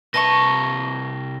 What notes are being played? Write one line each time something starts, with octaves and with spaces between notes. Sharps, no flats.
C2 B4 E5 A5 C#6 A#6 G7